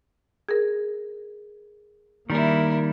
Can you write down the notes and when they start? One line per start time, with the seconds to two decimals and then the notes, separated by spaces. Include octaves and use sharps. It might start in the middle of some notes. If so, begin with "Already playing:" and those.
0.49 G#4 A#4
2.30 D#3 G3 A#3 E4 A#4